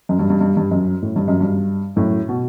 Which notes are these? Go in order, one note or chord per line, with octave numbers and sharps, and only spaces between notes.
F#2
G2
G2
G2
G2
F#2
A2
G2
F#2
G2
F#2 A2
B2